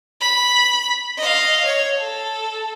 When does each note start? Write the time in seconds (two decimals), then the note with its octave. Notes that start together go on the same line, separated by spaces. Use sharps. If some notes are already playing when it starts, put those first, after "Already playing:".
0.20 B5
1.18 D#5 F5
1.65 C#5
1.99 A4